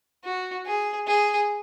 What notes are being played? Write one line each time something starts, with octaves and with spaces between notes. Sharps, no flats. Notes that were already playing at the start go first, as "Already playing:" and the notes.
F#4
G#4
G#4